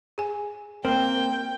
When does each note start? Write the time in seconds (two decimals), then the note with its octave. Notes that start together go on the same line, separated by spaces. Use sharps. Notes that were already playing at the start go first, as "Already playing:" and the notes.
0.18 G#4 G#5
0.85 A#3 C4 A#4 G5